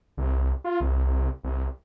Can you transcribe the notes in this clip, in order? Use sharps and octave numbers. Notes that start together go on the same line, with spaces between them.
C2
F4
C2
C2